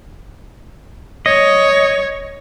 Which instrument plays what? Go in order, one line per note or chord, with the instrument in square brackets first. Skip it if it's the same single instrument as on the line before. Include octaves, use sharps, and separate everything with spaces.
[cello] C#5 [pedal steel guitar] D#5